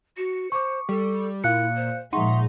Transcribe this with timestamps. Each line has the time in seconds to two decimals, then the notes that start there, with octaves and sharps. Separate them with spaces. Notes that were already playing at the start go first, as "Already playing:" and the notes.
0.17 F#4 C#7
0.52 C5 C#6 D6
0.89 G3 A4
1.44 A#2 E4 F5 F#6 C#7
1.76 C5
2.13 A#2 F3 G#3 D#4 E5 F#5 C6 C#6